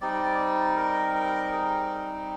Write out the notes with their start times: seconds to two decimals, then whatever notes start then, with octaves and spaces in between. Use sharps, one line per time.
0.01 G3 C4 D#4 D5
0.77 A#4
1.15 A#4
1.52 G#4